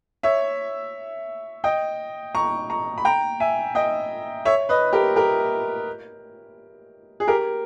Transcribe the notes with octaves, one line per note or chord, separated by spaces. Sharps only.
C#5 E5
D#5 G5
A#5 C#6
A#5 C#6
B5
G5 A#5
E5 G#5
D#5 G5
C#5 E5
B4 D#5
G4 A#4
G4 A#4
G#4
G4 A#4